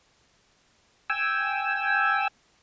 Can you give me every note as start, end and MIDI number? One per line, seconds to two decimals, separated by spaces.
1.10 2.28 79
1.10 2.28 80
1.10 2.28 88